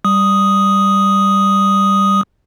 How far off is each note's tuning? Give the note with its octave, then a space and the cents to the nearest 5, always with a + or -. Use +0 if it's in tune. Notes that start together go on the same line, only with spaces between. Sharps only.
G3 +0 D#6 +0